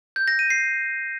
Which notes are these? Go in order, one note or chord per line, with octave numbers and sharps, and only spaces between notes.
G6
A#6
D#7
C7